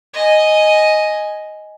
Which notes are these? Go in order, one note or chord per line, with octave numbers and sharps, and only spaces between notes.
D#5 G#5